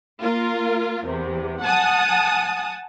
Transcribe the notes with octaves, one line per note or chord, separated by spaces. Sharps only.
A#3 F4 A#4
E2 C3
F#5 G#5 A5 D#6